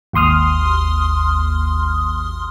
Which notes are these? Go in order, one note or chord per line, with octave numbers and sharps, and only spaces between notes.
G#1 D#2 C6 D#6 F6